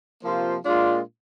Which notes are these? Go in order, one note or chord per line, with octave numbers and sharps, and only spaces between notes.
C3 F3 A#3 F4 C5
A#2 G#3 D4 F4